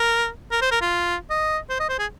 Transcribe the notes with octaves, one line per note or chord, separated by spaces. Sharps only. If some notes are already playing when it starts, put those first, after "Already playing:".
Already playing: A#4
A#4
C5
A#4
F4
D#5
C5
D#5
C5
G#4